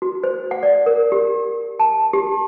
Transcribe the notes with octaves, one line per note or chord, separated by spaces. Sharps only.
F#4
C5
F#5
D5
A#4
G4
A5
G4